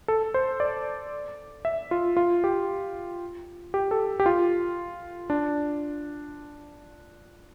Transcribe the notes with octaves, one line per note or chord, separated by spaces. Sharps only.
A4
C5
D5
E5
F4
F4
G4
G4
A4
G4
F4
D4